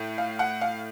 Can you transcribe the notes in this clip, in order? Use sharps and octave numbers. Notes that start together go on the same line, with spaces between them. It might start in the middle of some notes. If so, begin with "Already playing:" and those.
Already playing: A2 A3
F5
F#5
F5